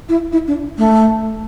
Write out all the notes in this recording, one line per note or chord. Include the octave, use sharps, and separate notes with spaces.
E4
E4
D4
A3